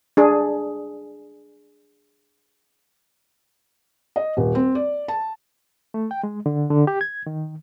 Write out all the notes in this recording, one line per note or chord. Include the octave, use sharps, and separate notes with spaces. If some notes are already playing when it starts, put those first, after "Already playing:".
D4 G#4
D#5
D#1
C4
D5
A5
A3
G5
G#3
D3
D3
G4
G#6
D#3